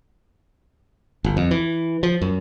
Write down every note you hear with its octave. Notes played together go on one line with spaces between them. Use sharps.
G1
F2
E3
F3
F#2